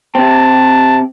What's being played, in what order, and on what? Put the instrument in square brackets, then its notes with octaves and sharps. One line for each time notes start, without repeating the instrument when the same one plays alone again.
[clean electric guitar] C3 C4 [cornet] A5